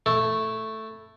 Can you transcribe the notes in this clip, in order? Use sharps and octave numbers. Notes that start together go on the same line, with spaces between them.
A3 E4 A4